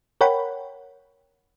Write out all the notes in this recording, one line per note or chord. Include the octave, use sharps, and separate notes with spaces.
A#4 C#5 F#5 G5 B5